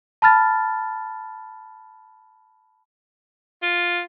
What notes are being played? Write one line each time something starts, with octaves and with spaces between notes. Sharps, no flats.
A5 B5 F6 A6
F4